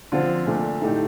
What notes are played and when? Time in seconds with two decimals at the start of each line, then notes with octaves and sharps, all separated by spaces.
0.12 D3 F3 C4 F4
0.46 A#2 A3 D4
0.82 A2 A3 D#4 G4